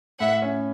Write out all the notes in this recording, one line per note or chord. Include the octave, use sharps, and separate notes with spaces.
A2 E5 F#5
C#4